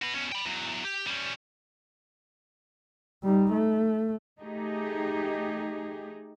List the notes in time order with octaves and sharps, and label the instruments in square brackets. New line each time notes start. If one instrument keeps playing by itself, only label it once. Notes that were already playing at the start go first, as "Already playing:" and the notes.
[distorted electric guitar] F#4 B4
B2 C#4
G5 B5
E2 F#3
G4
G3 C#4
[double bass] G3 D#4
A3
[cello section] A3 D#4 G4 G#4